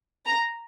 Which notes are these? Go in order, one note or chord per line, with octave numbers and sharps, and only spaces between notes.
A#5